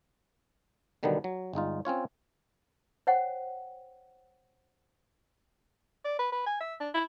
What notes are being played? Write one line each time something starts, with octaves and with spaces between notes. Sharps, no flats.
B2 D3 D#3 F#3 G3 B3
F#3
G1 G#3 D#4 F4
C4 C#4 F4 C#5
C5 C#5 F#5 G5
D5
B4
B4
G#5
E5
D4
E4